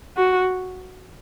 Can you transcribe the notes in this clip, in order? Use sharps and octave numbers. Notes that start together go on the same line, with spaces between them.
F#4